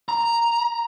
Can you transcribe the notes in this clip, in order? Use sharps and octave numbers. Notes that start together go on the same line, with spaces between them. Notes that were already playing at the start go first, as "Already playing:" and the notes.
A#5